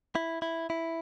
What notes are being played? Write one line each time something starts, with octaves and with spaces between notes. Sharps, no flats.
E4
E4
E4